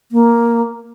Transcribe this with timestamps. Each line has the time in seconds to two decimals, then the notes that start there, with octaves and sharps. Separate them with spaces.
0.12 A#3